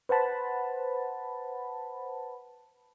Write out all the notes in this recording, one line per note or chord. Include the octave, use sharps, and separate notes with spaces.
B4 C5 F#5 A5 B5